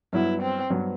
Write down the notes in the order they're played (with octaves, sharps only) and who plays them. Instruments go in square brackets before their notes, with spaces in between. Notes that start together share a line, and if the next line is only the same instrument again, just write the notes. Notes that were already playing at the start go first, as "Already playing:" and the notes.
[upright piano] G2 F#3 B3 [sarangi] E4
[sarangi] C4
[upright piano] G2 F#3 B3